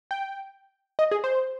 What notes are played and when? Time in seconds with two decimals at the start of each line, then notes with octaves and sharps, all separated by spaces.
0.11 G5
0.99 D#5
1.12 G#4
1.24 C5